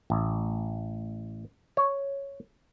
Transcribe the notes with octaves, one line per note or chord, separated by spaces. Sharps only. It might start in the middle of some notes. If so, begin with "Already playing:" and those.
A1
C#5